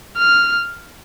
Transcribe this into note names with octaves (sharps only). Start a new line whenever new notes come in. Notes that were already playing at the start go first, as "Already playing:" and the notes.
F6